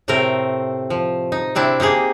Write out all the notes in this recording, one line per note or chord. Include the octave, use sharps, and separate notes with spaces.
A2 C3 A3 C4 A#4
F3
D#4
C3 C4 D4 E4
A#3 D#4 G4 G#4